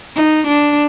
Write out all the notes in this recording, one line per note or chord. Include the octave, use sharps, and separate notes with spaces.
D#4
D4